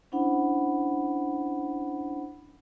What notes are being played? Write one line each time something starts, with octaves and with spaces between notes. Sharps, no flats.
C#4 D4 E4 C5 F#5 B5